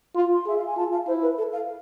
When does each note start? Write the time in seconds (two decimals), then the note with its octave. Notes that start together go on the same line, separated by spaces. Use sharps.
0.15 F4 C6
0.32 C6
0.46 G#4 E5
0.57 F5
0.67 G#5
0.76 F4 A5
0.92 F5
1.07 E4 C5
1.22 B4
1.38 A4
1.52 F5